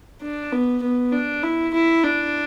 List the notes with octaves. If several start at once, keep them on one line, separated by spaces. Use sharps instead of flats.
D4
B3
B3
D4
E4
E4
D4